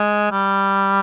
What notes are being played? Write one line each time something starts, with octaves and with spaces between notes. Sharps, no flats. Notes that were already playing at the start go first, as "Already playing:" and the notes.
Already playing: G#3
G3